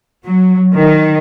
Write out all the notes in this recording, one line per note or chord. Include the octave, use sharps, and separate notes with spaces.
F#3
D#3